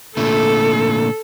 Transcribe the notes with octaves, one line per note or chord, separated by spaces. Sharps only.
A#2 D3 A3 A4